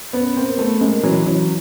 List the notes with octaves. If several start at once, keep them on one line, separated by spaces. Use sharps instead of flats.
B3 C#4
A#3 C4
A3 B3
G#3 A#3
E3 F#3
E3 F#3